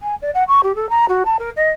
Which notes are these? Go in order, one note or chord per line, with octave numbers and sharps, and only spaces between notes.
G#5
D5
F#5
C#6
G4
A4
A#5
F#4
A5
A#4
D#5